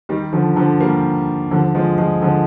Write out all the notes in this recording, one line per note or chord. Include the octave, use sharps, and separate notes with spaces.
D#3 G3
D3 F3
D3 F3
G3 A#3
D3 F3
F3 G#3
F3 G#3
D3 F3